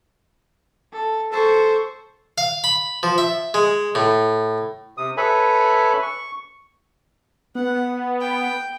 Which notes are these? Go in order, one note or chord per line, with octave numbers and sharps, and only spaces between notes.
A4
A4 C5 C#6
F5
B5
F3
E5
G#3
A2
C3 D#6
A4 B4 C#5 E5 G#5 B5
C#6
B3 F#5
G5